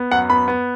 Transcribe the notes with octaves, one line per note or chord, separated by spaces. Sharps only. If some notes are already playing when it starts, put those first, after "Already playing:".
Already playing: B3
F#2 F#5
B3 B5
B3